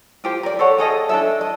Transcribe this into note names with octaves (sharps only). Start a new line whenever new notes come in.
F4 G4 C5
A#4 D5
A4 C5 C#5 F#5
G#4 A4 D#5 F5
D4 A4 E5
D#5